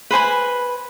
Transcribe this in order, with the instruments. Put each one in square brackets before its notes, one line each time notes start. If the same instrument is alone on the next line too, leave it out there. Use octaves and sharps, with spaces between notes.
[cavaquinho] B4 C5 G#5 B5